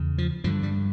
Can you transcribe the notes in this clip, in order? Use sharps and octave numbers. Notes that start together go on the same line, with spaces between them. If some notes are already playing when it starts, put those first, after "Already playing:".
Already playing: E2 C#3
F3
G2 D3 F3
G3